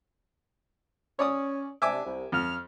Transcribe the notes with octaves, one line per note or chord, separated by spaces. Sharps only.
C#4 C#5 D5 D#6
C3 D4 E5 G#5 D6
C2
F2 F6